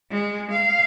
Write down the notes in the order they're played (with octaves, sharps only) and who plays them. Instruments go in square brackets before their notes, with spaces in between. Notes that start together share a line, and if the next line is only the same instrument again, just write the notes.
[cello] G#3
F5